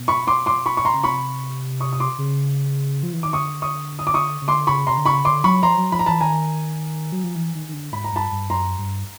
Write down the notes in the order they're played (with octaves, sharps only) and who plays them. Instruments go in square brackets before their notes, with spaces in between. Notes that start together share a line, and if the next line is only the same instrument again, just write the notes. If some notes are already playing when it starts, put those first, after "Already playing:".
Already playing: [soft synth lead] B2
[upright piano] B5 C#6
C6 D6
C6 D6
B5 C#6
C#6
A#5 C6
[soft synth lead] C#3
[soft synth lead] C3 [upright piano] B5 C#6
[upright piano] C#6 D#6
D#6
C6 D6
[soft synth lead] C#3
F3
E3
[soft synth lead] D#3 [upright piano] D6
[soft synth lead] D3 [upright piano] C#6 D#6
[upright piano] C#6 D#6
D#6
D6
C#6 D#6
[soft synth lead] C#3
[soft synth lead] D3 [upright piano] C6 D6
[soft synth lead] C#3 [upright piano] B5 C#6
[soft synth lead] C3 [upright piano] A#5 C6
[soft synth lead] D3
[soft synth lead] C#3 [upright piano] B5 C#6
[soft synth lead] D3 [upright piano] C6 D6
[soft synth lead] F#3 [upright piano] B5 C#6
[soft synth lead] F3 [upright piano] A#5 C6
[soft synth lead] F#3
[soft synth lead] F3 [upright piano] B5
[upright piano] A#5
[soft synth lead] E3 [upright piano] A5 B5
[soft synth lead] D#3 [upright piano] G#5 A#5
[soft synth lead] F#3
F3
E3
D#3
D#3
D3
[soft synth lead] G#2 [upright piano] B5
[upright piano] A#5
[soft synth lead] G2 [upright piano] A5 B5
[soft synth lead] G2
[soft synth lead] F#2 [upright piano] A#5 C6
[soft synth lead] G2